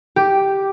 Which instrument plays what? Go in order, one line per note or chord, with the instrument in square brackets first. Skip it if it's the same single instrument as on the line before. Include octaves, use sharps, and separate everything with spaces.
[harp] G4